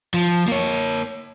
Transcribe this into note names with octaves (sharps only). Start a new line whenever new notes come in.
F3
A#3 C#5